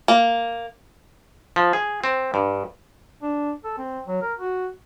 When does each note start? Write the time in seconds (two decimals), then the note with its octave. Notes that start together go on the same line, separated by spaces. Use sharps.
0.08 A#3
1.56 F3
1.73 G#4
2.04 C4
2.34 G2
3.22 D4
3.64 A4
3.78 C4
4.08 F#3
4.22 A#4
4.39 F#4